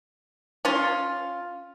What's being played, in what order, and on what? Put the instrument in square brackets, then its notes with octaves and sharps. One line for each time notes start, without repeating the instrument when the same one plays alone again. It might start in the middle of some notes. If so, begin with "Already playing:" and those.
[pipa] C#4 F4